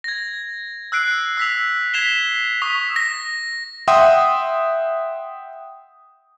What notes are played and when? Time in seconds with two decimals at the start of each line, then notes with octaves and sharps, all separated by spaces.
0.04 G#6 A#6
0.92 E6 F#6 C7 D7
1.37 E6 B6 F7
1.94 G#6 B6 C7 E7 F7 G7
2.62 C#6 D#6 B6
2.96 A#6
3.88 E5 F#5 G5 C6 D#6